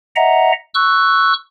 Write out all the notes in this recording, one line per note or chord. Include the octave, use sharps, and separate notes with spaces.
D#5 E5 F#5 A#5
C#6 E6 F#6